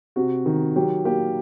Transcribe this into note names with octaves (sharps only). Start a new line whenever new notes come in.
C3 F#4
D#3
F#3 G4
A#3 G4